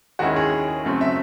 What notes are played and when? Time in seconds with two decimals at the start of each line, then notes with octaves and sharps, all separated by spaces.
0.19 D#2 D#3 G#3 C#4 E4 F#4
0.36 G#4
0.85 F#2 C#3 F#3 A3 C4
1.01 E5